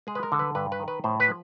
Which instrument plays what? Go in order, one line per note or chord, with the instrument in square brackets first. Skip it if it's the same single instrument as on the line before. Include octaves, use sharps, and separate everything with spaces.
[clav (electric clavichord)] G#3 G#4
B4
A#4
D3
B4
G2 B4
B4
D#3
B4
A2 C5
B4
F3